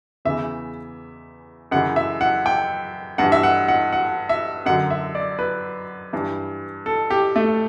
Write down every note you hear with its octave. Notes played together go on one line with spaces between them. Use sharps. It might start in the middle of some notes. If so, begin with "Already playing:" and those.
E2 C#3 E3 E5
F#2 C#3 E3 F#5
E5
F#5
G5
G2 E3 F#5
E5
F#5
F#5
F#5
E5
F#2 D3 F#3 F#5
E5
D5
B4
G2 E3
A4
G4
A3